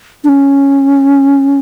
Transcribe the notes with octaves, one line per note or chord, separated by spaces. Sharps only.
D4
C#4